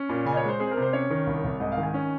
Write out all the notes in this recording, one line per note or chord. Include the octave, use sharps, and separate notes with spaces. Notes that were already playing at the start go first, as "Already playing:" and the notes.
Already playing: C#4
A#2
C#3 G#5
D#5
C#5
G#3
C5
C4 G#4
A#4
C3
C5
C#4 C#5
D#3
C2
C2
G#2 D#5
F5
D#3
G#5
C#4